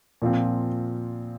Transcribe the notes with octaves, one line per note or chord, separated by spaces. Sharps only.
A#2 F3 C4